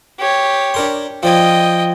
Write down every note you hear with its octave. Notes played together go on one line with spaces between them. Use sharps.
G4 C#5
D4 A#4 C6
F3 D5 D#5 G5 G#5